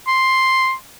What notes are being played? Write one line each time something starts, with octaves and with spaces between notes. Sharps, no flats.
C6